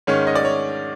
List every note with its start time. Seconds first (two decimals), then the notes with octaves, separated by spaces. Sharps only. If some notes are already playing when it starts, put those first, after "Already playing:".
0.07 G#2 D#3 G#3 C#4 C#5
0.27 D#5
0.35 D5
0.45 C#5